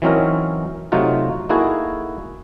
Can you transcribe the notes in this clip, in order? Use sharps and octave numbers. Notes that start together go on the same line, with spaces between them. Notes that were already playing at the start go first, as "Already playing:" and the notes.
E3 F#3 C4 C#4 D#4 A#4
C3 F#3 A3 D#4 F4 F#4
A#3 D#4 E4 F#4 G#4 A4